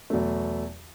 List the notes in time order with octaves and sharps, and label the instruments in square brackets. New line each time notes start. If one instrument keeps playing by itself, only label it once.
[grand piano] E2 B2 F#3 A3